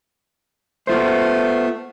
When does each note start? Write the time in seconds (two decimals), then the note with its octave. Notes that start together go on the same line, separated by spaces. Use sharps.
0.87 A3 B3 F4 C5